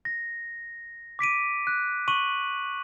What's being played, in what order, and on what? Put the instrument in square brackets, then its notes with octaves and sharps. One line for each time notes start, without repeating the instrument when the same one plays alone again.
[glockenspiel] A#6
D6 B6 D7 D#7
F#6
C#6 D#7 F#7